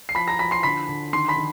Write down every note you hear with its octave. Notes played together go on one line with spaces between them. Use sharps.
C7
F3 B5 B6
A#5 A#6
F3 B5 B6
C6 C7
D3 B5 B6
D3
D#3 C6 C7
B5 B6
D#3